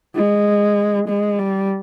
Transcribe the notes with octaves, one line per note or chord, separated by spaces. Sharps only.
G#3
G#3
G3